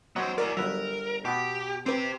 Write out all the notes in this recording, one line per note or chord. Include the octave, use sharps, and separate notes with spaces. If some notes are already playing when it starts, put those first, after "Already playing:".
F#3 B3 C5 D#5
E4 A#4 D5
G1 F#3 A#4 B4 E5
B2 B3 G4
C4 G4 B4 C5